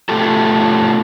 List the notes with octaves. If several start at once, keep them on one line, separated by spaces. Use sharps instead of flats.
B2 A3 F4 G4 A4